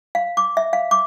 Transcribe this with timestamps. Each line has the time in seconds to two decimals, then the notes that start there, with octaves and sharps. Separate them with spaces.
0.15 F5
0.37 D6
0.57 E5
0.73 F5
0.91 D6